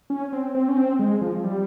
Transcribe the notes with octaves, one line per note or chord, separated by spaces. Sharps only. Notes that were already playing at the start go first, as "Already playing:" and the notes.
C#4
C4
C4
C#4
C4
G#3
F3
G3